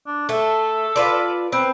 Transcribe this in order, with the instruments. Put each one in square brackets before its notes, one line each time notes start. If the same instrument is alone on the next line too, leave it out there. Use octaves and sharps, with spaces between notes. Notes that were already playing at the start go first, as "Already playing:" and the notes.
[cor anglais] D4
[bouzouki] A3 [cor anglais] A4
[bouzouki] F4 B4 D5
[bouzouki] C4 [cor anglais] B4